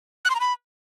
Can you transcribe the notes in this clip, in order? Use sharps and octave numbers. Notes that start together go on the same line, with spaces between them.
F#6
C6
A#5
B5